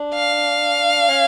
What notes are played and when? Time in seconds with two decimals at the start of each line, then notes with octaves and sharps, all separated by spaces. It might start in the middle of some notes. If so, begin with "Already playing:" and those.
Already playing: D4
0.14 F5
1.08 C#4